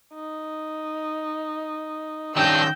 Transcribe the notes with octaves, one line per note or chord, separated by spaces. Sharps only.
D#4
D#3 C#4 D4 G4 G5 E6 G6 A#6